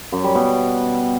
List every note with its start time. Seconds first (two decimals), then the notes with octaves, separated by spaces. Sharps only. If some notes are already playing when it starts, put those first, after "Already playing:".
0.12 F#2
0.24 G3
0.35 B2